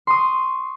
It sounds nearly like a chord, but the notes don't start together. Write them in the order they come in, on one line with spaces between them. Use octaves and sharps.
C6 D#6 C#6